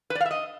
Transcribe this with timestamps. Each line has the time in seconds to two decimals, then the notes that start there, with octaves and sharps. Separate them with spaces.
0.10 B4
0.15 D5
0.20 F5
0.26 E5
0.31 D#5